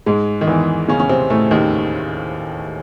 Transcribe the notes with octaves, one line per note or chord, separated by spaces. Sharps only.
G#2 G#3
D#3
E2 E3
C#3 C#4
C#4
C3 C4
A2 A3
D#2 D#3